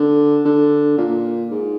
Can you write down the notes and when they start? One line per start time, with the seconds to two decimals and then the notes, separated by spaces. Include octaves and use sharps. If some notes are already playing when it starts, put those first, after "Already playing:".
Already playing: D3
0.45 D3
0.98 A#2
1.51 G#2